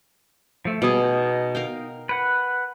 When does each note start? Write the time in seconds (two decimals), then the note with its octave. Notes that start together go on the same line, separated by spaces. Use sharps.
0.65 F3 A3
0.82 B2 G3 G#4 D#6
1.04 D#4
1.55 A#4 F5 G5
2.09 B4 F#5